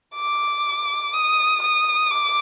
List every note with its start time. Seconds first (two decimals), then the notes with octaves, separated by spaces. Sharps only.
0.15 D6
1.13 D#6
1.62 D#6
2.11 D6